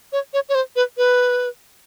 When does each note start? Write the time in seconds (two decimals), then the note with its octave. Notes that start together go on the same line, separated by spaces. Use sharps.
0.12 C#5
0.33 C#5
0.49 C#5
0.55 C5
0.76 B4
0.97 B4